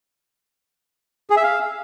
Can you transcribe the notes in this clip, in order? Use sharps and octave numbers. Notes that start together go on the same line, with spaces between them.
G#4
E5
F5